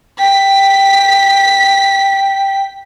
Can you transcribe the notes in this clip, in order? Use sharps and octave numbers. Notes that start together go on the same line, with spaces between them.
G5 B6